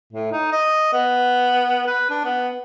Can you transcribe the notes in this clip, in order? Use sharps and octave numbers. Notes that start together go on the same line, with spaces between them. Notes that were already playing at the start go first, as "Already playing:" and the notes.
A2
D#4
D#5
B3
B4
D4
B3